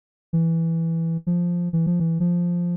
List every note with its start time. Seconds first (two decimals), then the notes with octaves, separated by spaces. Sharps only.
0.33 E3
1.27 F3
1.73 E3
1.87 F3
2.00 E3
2.20 F3